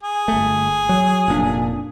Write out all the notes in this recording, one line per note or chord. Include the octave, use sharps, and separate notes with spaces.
G#4
G1 A3
F#3
F1 A#2 D4